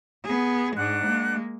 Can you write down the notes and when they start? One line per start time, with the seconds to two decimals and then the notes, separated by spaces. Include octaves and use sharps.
0.24 B3 G#4
0.76 G#2 G#3 D4 F#5 F#6
1.06 G#3 A#3